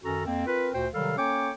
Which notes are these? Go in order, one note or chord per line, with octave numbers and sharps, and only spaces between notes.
F#2 D#3 C#4 F#4 A4 A#5
F2 A#3 C4
C4 F4 A#4 B4
D2 A#2 F#4 C5 G5
C3 D#3 F#3 G3 A4 F5
A#3 C#4 A4 C#5 G5 D6